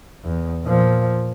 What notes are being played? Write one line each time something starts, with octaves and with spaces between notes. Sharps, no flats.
E2
A#2 F3